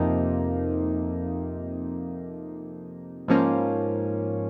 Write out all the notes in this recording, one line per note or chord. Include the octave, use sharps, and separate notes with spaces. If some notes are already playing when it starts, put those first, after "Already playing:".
Already playing: F2 C3 F3 A#3 D#4
G#2 F3 A#3 C#4